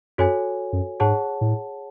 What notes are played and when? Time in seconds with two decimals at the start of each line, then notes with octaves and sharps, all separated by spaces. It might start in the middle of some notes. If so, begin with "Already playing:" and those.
0.18 F#2 F#4 A4 C#5 G#5
0.73 F#2
1.00 G#2 G#4 C#5 F#5 A5
1.41 A2